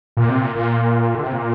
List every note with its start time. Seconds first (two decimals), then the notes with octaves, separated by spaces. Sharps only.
0.17 A#2
0.29 C3
0.41 A#2
0.55 A#2
1.15 D3
1.23 C3
1.32 A#2